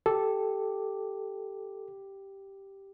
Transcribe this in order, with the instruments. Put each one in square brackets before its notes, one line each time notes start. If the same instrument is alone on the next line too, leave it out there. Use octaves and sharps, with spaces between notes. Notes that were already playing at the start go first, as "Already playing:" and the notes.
[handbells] G4 [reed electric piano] A4